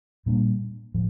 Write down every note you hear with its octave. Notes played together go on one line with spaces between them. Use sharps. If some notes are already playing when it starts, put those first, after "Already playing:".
A#2 G3 A#3 D4
A2 F3